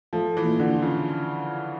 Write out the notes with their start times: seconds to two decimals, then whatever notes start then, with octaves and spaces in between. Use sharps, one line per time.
0.13 F3 A3
0.37 E3
0.44 A#2
0.60 D3
0.75 F4
0.82 C#3